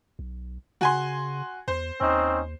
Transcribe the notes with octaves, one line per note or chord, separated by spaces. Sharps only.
B1
C#3 F#4 G#5 C6
E2 C5
D#2 C4 C#4 D#4